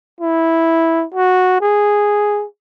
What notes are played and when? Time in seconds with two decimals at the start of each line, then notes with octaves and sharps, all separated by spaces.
0.21 E4
1.15 F#4
1.61 G#4